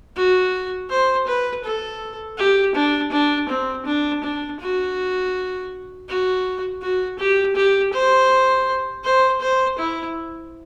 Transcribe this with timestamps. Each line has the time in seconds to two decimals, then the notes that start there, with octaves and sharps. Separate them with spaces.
0.16 F#4
0.90 C5
1.27 B4
1.64 A4
2.38 G4
2.75 D4
3.12 D4
3.49 C4
3.86 D4
4.23 D4
4.60 F#4
6.08 F#4
6.82 F#4
7.19 G4
7.55 G4
7.93 C5
9.04 C5
9.41 C5
9.78 E4